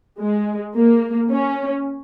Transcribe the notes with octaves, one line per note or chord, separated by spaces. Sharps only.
G#3
A#3
C#4